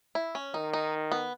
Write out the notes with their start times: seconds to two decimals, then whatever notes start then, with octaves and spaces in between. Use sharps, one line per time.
0.15 E4
0.35 C#4
0.54 D#3 D#4
0.73 D#4
1.12 B3